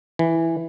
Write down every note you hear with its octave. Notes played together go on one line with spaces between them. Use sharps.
E3